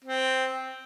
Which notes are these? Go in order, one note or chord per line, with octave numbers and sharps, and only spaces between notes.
C4